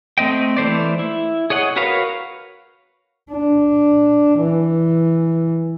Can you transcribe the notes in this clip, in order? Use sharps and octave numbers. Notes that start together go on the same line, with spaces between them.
A3 C4 D#5 G5
E3 A3 C5 D5
E4
G#4 C#5 D#5 F#5
F#4 A#4 B4 C#5 F5
D4
E3